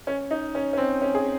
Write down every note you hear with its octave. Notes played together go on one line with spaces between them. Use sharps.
C#4
D#4
C#4
C#4
C4
C#4
G#4